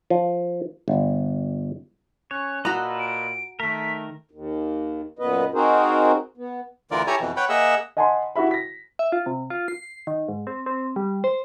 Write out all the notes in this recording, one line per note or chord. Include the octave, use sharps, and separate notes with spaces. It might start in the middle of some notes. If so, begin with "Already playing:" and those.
F3
G1
C#4 C#5 F#6
A#2 F#4 A4 B4 D#5 A#5
D7
D#3 A3 A#4 B6
D#2
F#2 A#2 B3 B4 D#5
C4 D#4 F#4 G#4 A#4 C5
B3
D2 D3 E3 F4 A#4 D5
E4 G4 A4 C#5 G#5 A#5
F2 B2 E3
B4 C#5 F#5 G5 B5
A#3 G#4 D#5 E5 F#5 E6
D#5 F#5 G#5 A5 B5 C6
E4 F#4 G4 E5 B5
A#6 B6
E5
F4
C3
F4
C7
D#3
G#2
C4
C4
G3
C5